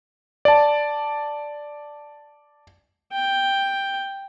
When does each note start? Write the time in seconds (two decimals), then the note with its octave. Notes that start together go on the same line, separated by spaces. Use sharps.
0.45 D5 A5
3.13 G5